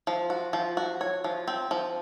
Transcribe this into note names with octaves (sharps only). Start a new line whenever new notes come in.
F3
F#4
F3
F#4
C#5
F3
C4
F3